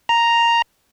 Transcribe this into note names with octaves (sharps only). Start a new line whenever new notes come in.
A#5